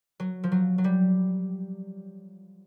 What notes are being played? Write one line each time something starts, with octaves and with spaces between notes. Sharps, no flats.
F#3
F3
F#3
F#3
G3